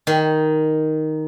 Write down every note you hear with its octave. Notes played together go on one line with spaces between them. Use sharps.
D#3